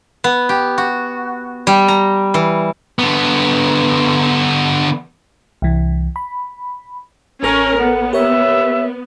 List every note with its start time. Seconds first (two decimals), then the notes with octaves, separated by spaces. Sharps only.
0.24 B3
0.49 G4
0.78 F#4
1.67 G3
1.88 A#5
2.34 E3
2.99 D3 B3
5.62 C2 E3
6.16 B5
7.43 A1 C#4 A4 A#4 C#5
7.79 B3 F#5
8.13 G4 A#4 C#5 E5